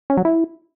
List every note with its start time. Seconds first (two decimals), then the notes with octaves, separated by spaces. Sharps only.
0.10 C#4
0.17 F#3
0.25 E4